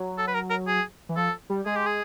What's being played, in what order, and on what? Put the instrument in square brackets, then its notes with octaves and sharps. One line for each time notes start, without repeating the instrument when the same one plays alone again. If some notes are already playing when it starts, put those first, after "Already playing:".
Already playing: [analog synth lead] F#3
[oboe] A4
B4
A#4
A#4
G#4
[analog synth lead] E3
[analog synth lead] F3 [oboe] A4
[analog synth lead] G3
[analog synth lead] G#3 [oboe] G#4
[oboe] G4
G#4